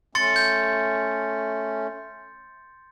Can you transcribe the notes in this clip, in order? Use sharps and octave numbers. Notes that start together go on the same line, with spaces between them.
A3 C#4 C6 A6 C#7
G6